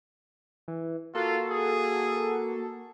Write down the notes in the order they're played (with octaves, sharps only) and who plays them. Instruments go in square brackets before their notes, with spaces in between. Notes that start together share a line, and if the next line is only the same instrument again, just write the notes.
[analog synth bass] E3
[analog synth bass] A#3 [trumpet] F4 [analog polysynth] F#4 A4
[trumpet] G#4